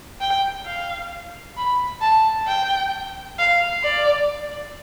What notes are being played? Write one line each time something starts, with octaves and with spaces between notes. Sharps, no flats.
G5
F5
B5
A5
G5
F5
D5